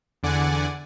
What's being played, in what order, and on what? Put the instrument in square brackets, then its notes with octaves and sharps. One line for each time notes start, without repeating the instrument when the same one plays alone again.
[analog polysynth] E2 D3 D5 F#5 G#5